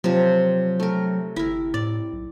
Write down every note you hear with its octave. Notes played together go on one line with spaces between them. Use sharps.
C3 F3 F#3
A3 A#4
G1 E4 A#4
A2 D5
B1